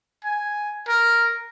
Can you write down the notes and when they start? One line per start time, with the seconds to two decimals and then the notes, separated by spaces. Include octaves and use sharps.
0.25 G#5
0.88 A#4